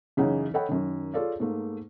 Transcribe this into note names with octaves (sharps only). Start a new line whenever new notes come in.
F#2 C#3 E3 D#4 F#5 G#5
A4 C#5 D#5 F#5 G5 B5
F#2 D#3
F4 G#4 A4 C#5 D5 F5
G#2 A3 A#3